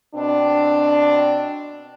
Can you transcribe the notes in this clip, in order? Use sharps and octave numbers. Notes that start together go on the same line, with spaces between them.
B2 C4 D4